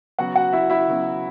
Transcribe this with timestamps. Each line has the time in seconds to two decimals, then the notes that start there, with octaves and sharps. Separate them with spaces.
0.19 C#3 F#3 B3 F#4 F#5
0.35 F#4 F#5
0.53 E4 E5
0.70 E4 E5
0.88 C#3 F#3 B3